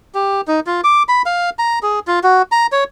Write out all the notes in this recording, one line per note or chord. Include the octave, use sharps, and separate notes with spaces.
G4
D#4
F4
D6
B5
F5
A#5
G#4
F4
F#4
A#5
C#5